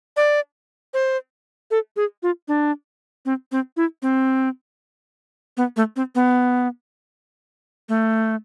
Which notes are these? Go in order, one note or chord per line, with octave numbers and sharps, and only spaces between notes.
D5
C5
A4
G#4
F4
D4
C4
C4
E4
C4
B3
A3
C4
B3
A3